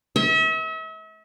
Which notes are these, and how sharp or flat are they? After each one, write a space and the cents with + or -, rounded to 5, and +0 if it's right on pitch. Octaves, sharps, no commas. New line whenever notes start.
E5 -40